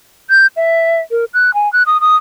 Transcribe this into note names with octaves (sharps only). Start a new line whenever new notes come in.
G6
E5
A#4
F#6
G#5
F#6
D#6
D#6